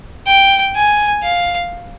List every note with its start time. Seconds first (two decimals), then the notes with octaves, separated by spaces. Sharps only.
0.27 G5
0.75 G#5
1.23 F5